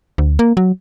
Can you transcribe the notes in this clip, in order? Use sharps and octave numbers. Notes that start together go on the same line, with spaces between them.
D2
A#3
F#3